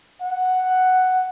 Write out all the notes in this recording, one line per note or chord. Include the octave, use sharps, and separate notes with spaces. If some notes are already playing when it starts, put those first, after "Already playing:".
F#5